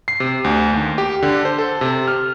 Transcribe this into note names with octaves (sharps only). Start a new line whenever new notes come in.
C7
C3
D2
D#2
G4
D3
C5
A4
C3
F6